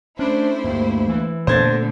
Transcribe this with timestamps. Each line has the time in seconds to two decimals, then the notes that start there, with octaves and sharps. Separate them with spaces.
0.19 A3 C#4 D4 E4 C5
0.64 D2 G2 A#3
1.08 E3
1.47 A#2 D3 A3 B3 C5 G#6 A6